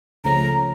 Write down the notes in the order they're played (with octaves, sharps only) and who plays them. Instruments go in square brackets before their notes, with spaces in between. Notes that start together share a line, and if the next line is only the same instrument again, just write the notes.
[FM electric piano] C#2 C#3 F3 A3 C#4 [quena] A#5